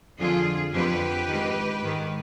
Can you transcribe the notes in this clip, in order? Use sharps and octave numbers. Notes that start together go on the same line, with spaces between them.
F2 D3 F3 F4 G#4
F2 D3 F3 G4 B4
D#3
G#2
G#2 D#3